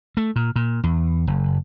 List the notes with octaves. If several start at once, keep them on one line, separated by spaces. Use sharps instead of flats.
A3
A#2
A#2
E2
F#1